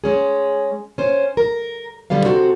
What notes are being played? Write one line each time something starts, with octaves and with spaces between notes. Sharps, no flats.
G#3 C#4 G#4
C#4 C5
A#4
D3 G3 B3 F5
C3 C4 F#4 A4